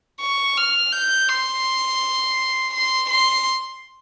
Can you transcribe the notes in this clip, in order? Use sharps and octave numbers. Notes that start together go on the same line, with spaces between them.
C#6
F6
G6
C6
C6
C6